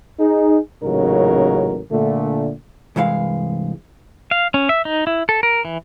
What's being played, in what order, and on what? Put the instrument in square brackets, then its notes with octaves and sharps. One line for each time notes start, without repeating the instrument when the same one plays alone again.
[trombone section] D#4 G#4
A1 A#2 C#3 F#3 D#4 A#4
A#2 D3 A3
[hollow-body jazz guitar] C2 G2 E3 G#3 F5
[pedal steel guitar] F5
C#4
E5
D#4
E4
A4
A#4
E3